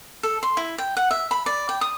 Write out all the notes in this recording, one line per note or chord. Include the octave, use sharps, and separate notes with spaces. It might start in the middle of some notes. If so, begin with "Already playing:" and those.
A4
C6
E4
G5
F#5
E5
B5
D5
G5
D#6